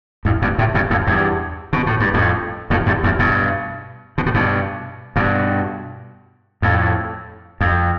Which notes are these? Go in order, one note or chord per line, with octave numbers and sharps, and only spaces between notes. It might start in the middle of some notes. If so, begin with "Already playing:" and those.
F2 A2
G2 B2
A2 C3
G2 B2
F2 A2
E2 G2
B2
A2
G2
F2 A2
F2 A2
E2 G2
E2 G2
G2 B2
B2
A2
G2 B2
G2 B2
F2 A2
F2